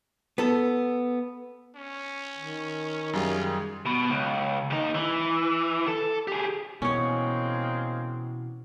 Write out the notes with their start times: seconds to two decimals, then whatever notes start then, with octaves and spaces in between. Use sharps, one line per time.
0.38 B3 A4
1.75 C#4
2.38 D#3
3.13 F#2 G3 F4 G#4
3.86 B2
4.10 C#2
4.71 D#2 D#4
4.95 E3
5.87 A4
6.27 G4 G#4
6.82 B2 E3 G#3 A#3 C4 C#4 C#5